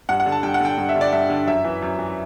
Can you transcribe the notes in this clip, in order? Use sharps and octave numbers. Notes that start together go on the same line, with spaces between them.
G2 F#5
F#5
D3
A5
G2 G5
F#5
D3 G5
G2
E5
D3
D5
G2 E5
D3
F#2 E5
E3
F#2
E3